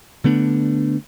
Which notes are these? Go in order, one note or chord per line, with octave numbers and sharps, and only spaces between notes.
D3 A3 B3 D4